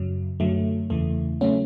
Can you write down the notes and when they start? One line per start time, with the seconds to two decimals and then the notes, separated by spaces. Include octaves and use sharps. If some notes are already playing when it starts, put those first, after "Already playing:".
Already playing: F#2 C#3 F#3
0.40 F#2 D3 F#3 A3
0.90 E2 C#3 E3 A3
1.41 C#3 F#3 A3 C#4